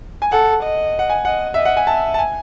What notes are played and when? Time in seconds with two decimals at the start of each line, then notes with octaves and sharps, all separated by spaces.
0.22 G#5
0.31 A4 F#5
0.63 D#5
0.99 F#5
1.10 G#5
1.25 D#5 F#5
1.54 D#5 E5
1.65 F#5
1.77 G#5
1.87 E5 A5
2.14 A5
2.19 G#5